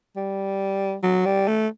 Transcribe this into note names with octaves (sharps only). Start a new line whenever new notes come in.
G3
F#3
G3
A3